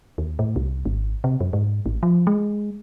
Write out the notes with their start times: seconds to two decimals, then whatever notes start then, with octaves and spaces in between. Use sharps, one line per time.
0.18 D#2
0.39 A2
0.56 C2
0.85 G#1
1.24 C3
1.41 F#2
1.53 G#2
1.86 A1
2.03 F3
2.27 G#3